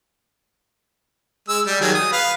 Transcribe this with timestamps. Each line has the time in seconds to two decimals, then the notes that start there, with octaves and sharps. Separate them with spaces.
1.49 G#3 E6
1.66 G3
1.81 D#3 F#3 G#4
1.94 D#6
2.12 B4 F5